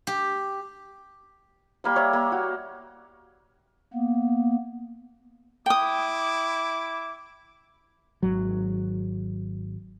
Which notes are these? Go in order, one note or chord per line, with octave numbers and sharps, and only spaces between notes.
G4
G3 A#3 B5
C#5 D5 E5 A#5
A#3
F#4
A#3 B3
E4 G5 D6 D#6
G#1 F#3